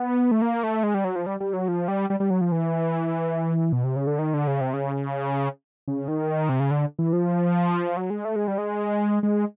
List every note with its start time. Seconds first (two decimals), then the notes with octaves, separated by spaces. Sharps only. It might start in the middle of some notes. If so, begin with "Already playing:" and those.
Already playing: B3
0.31 A3
0.42 A#3
0.63 A3
0.83 G#3
0.94 G3
1.05 F#3
1.16 F3
1.26 G3
1.40 G3
1.53 F#3
1.68 F3
1.88 G3
2.10 G3
2.20 G3
2.30 F#3
2.41 F3
2.52 E3
3.72 B2
3.84 C3
3.96 C#3
4.07 D3
4.19 D#3
4.34 D3
4.47 C#3
4.61 C3
4.74 C#3
5.88 C#3
6.08 D#3
6.49 C3
6.60 C#3
6.71 D3
6.99 E3
7.13 F3
7.97 F#3
8.10 G#3
8.25 A3
8.36 G#3
8.48 G3
8.58 G#3
9.23 G#3